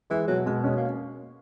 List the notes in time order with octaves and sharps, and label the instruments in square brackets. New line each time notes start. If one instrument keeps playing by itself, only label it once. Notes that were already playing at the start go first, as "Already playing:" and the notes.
[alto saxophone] E3 [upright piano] G#3
[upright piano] B2 [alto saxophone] F#3
[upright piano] B2 [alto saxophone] G#3
[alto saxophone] G#3 [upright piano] C#4
[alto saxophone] A#3